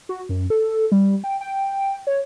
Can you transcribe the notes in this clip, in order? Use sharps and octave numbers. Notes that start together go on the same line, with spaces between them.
F#4
F#2
A4
G3
G5
G5
C#5